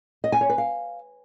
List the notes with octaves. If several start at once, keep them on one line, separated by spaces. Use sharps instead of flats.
D#5
G#5
C#5
B4
F5